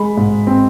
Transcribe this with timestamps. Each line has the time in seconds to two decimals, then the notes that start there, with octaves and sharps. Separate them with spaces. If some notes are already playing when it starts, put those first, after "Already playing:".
Already playing: G#3 B5
0.17 G#2
0.47 C4